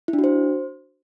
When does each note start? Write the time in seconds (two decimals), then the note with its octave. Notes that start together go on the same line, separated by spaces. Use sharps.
0.08 E4
0.13 D4
0.19 F#4
0.24 C5